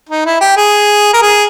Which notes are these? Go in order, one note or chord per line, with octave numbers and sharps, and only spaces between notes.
D#4
E4
G4
G#4
A#4
G#4